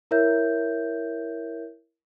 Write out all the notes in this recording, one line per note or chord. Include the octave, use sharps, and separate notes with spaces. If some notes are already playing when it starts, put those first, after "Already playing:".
E4 A#4 C#5 E5 G6